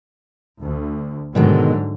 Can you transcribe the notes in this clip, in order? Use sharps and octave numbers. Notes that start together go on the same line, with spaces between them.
D2
G#2 B2 D3 D#3 F#3 G#3